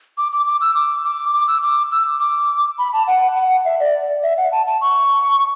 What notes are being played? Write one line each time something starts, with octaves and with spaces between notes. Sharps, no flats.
D6
D6
D6
E6
D6
D6
D6
E6
D6
E6
D6
B5
A5
F#5
F#5
E5
D5
E5
F#5
A5
A5
C#6